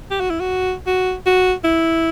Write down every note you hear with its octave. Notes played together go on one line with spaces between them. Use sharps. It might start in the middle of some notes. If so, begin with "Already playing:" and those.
G4
F#4
E4
F#4
F#4
F#4
E4